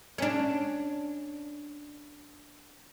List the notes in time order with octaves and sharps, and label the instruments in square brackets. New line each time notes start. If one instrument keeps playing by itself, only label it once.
[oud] C#4 D4